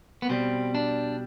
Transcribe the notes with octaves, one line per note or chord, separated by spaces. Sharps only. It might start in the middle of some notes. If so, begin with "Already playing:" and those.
B3
B2 G3 C4
D4